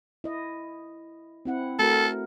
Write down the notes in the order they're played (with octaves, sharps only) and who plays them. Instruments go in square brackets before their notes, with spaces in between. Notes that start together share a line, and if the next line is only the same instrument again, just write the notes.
[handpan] E4 D#5
C4 E4 F#5
[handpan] A3 F#4 A#4 [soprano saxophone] A4